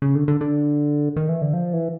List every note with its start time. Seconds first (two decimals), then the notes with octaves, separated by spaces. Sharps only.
0.02 C#3
0.15 D3
0.28 D3
0.41 D3
1.16 D#3
1.29 E3
1.42 D3
1.53 F3
1.73 E3